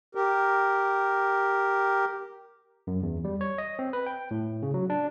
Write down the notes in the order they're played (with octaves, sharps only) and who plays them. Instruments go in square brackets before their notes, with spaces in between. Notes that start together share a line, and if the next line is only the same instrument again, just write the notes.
[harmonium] G4 A#4
[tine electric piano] F#2
E2
G3
C#5
D#5
C4
B4
G5
A2
C#3
F#3
D4